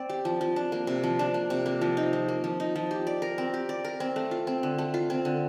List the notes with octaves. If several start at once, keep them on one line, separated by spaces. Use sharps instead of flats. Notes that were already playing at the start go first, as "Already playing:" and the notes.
Already playing: C4 D5
G4
F3
F3
D4
A#3
C3
F3
D4
A#3
C3
A#3
F3
D#4
F3
A#3
F3
D#4
F3
G4
D5
A#4
C4
G4
D5
A#4
C4
A3
F4
C4
D3
A3
F4
C4
D3